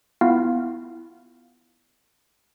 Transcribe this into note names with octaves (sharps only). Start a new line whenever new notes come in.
B3 E4 F4 F5